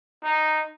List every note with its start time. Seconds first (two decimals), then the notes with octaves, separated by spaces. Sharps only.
0.24 D#4